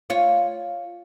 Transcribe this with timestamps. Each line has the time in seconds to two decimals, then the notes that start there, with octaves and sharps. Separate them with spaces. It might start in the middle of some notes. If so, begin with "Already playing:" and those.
0.10 F4 C#5